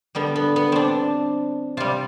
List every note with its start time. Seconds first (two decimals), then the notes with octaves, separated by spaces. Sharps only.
0.15 D3 G3 B3
0.36 B3
0.56 B3
0.72 C4 D4
1.77 C3 G3 F4